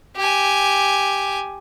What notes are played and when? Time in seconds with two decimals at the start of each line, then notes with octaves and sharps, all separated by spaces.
0.16 G4 G#5